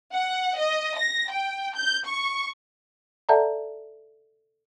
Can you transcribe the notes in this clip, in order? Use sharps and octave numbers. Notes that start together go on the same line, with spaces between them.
F#5
D#5
A#6
G5
G6
C#6
A4 D5 E5 F#5 A5 A#5